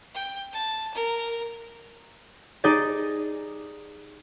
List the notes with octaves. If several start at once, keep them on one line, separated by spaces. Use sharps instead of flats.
G5
A5
A#4
D#4 G4 G#4 D5